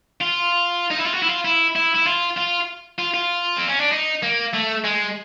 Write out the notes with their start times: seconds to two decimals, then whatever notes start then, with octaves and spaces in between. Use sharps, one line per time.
0.21 F4
0.91 D#4
0.98 E4
1.05 F4
1.14 F#4
1.22 E4
1.29 F4
1.45 E4
1.75 E4
1.95 E4
2.06 F4
2.37 F4
2.98 F4
3.14 F4
3.58 C4
3.69 C#4
3.80 D4
3.92 D#4
4.23 A#3
4.54 A3
4.84 G#3